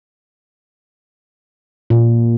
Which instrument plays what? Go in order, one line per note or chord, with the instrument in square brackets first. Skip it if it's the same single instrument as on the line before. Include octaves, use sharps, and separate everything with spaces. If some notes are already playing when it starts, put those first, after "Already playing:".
[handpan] A#2